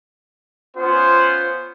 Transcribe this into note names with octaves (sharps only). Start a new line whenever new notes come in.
B3 C#4 F4 C5